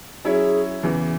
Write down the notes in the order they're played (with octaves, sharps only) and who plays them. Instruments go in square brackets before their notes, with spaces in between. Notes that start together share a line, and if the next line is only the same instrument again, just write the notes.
[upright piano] F#3 C#4 E4 C#5 [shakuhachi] G#4
[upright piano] E2 C#3 E3